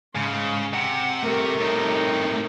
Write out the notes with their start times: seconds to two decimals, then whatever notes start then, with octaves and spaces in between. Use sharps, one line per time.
0.15 G#2 C#3 C6
0.74 C3 F#5
1.23 G2 A3 G4 A#4
1.60 A2 C3 D#4 A#4